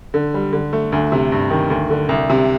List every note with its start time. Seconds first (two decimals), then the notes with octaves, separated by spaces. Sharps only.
0.14 D3
0.34 G3
0.53 D3
0.73 A3
0.92 D2
1.12 C3
1.32 G2
1.50 D#3
1.70 D2
1.90 D3
2.09 C2
2.30 C3